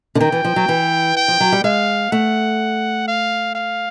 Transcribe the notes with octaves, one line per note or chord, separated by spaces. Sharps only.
D3
D#3 G5
E3
F3
F#3
E3
G5
F3
F#3
G3
G#3 F5
A3 F#5
F5
F5